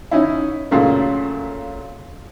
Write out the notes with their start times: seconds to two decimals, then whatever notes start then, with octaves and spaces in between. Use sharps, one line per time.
0.11 C#4 D#4 E4
0.71 F#2 A#2 C#3 A3 A#3